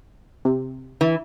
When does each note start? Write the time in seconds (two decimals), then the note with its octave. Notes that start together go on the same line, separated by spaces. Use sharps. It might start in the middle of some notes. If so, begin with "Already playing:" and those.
0.45 C3
1.01 E3